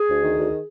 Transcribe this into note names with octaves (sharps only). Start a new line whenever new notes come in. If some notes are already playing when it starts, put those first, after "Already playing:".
Already playing: G#4
D2
D#3
D2